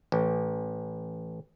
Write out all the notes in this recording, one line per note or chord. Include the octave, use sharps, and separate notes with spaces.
A1